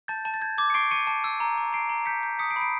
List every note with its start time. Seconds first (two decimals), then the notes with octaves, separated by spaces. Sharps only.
0.08 A5 G6 A6
0.25 A5
0.34 A6
0.41 G6 G#6
0.58 D6 G#6
0.70 C#7
0.74 C#6 C7 D7
0.91 C#6 C#7 D#7
1.07 A5
1.24 E6
1.40 A#5
1.57 C#6
1.73 A#5 C7 D7
1.89 A#5
2.06 G6 B6 C#7
2.23 G6
2.39 D#6 B6 C#7
2.51 C7 D7
2.56 B5
2.61 C7 D7